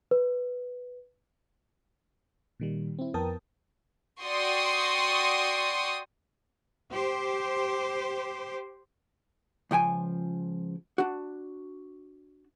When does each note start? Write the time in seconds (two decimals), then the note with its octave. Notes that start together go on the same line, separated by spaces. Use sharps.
0.11 B4
2.60 A#2 D#3 G3
2.99 C4 E4
3.14 F2 B3 A#4 G5 A5 D#6
4.24 F#4 D5 G5 C6 C#6 D#6
6.91 G4 C5
9.71 C#2 F3 G5 G#5
10.98 D4 F#4